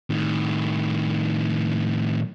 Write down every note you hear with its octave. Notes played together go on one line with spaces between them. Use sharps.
A2 D#3